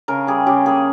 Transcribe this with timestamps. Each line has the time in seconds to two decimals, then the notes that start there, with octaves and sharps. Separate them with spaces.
0.08 C#3 A#4
0.27 G3 G#4
0.47 C#3 G4
0.66 A#3 G#4